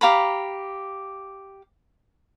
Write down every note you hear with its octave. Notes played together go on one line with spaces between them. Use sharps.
G4 F5 A#5 B5